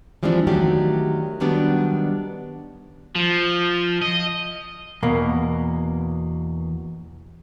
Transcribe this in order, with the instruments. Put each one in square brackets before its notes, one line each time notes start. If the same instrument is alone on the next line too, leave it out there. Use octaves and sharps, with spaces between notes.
[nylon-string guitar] E3 F3 G3 G#3 C4 D4
D#3 F#3 A3 D4 G4
D#3 F#3 G3 B3 D4
[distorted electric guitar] F3
D#5
[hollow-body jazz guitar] E2 B2 A#3